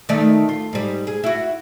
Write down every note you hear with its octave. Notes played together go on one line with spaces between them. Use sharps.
D#3 A3 D5
F4
G#2 G3
G#4
E4 F#4